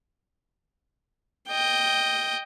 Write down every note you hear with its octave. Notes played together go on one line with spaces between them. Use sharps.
D#5 G5